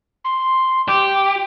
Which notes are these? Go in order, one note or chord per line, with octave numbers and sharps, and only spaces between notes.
C6
G4 D6